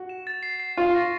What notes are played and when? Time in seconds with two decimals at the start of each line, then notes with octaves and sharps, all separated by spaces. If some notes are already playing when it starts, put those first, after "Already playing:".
Already playing: F#4
0.09 E7
0.27 A6
0.43 C7
0.60 C7
0.77 F4 C#6
0.95 A#6